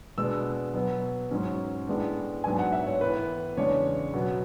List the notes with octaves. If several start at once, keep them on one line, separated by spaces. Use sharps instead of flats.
B2 G#3 B3 D4 E6
B2 F#3 B3
G#2 F#3 C#4
A2 G#3 B3 D4
G#2 F#3 B3 D4 G#5
F#5
E5
C#5
A2 E3 B3 B4
E2 C#3 G#3 D4 C#5
B2 F#3 B3